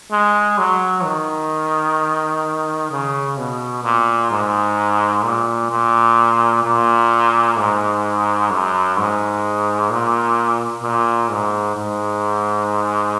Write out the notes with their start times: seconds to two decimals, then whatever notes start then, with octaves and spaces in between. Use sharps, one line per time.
0.11 G#3
0.58 F#3
1.05 D#3
2.91 C#3
3.38 B2
3.84 A#2
4.31 G#2
5.24 A#2
5.71 A#2
6.64 A#2
7.58 G#2
8.50 F#2
8.97 G#2
9.90 A#2
10.83 A#2
11.30 G#2
11.76 G#2